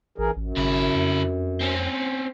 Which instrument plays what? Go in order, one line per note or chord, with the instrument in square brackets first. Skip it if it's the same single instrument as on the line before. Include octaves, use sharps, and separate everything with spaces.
[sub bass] A1 [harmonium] E3 G#4 A#4
[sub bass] A1 [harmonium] F#2
[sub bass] G#1 [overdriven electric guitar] C#3 E4
[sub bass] F2
[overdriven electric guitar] C4 C#4